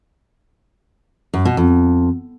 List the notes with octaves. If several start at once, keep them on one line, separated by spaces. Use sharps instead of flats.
F#2
B2
F2